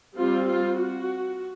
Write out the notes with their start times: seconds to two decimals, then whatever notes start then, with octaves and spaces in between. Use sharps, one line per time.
0.18 G3 C4 F4
0.48 F4
0.80 F#4